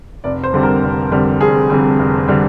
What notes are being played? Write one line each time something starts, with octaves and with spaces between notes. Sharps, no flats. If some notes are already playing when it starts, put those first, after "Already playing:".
F1 D5
C5
F2 D3 G3 C4
A#4
F1
F2 D3 G3 C4
F1 G#4
F2 D3 G3 C4
F1
D3 G3 C4